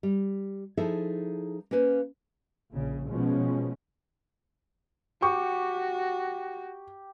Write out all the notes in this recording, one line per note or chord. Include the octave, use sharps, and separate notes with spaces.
G3
F3 D#4 E4 G#4 A4 E5
A#3 C#4 B4 C5
A#1 C#3
B2 F3 G#3 C#4
F#4 G4 C#6